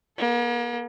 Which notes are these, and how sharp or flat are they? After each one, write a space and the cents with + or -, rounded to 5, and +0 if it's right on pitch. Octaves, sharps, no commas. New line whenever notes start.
A#3 +45 A4 +0